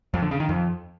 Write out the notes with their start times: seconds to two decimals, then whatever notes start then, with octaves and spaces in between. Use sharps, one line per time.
0.14 F2
0.22 D3
0.31 C#3
0.40 D#3
0.49 F2